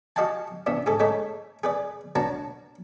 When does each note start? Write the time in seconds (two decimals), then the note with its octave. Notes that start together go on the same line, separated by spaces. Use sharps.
0.16 F#4 G4 D#5 F5 G#5 A5
0.66 C3 E3 B3 D4
0.86 G#2 G#4 A4
1.00 G#3 A3 D#4 A4 C#5
1.64 G#4 B4 D5
2.15 D4 F#4 B4 C#5 A5 A#5